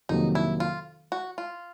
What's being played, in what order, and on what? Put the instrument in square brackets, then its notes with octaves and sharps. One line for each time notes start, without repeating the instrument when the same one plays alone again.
[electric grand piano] F2 C3 D#3 F#3 A#3 [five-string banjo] D#4
[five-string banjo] E4
F4
F#4
F4